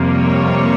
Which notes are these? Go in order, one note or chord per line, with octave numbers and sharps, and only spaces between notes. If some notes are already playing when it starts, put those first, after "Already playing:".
Already playing: F2 C3 G3 A#3
C#5